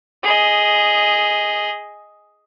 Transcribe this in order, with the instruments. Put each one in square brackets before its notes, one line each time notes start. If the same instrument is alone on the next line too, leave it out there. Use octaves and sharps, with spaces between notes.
[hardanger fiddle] G#4 D#5